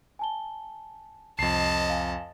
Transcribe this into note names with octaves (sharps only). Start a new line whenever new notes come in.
G#5 A5 G7
C2 F2 D#5 A5 C7
F5 G#5